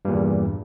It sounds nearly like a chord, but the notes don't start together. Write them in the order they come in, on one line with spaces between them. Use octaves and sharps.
G2 A#2 E2